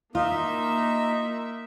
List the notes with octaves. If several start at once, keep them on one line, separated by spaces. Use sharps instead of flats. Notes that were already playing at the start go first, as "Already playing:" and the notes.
A#3 D#4 F4 E5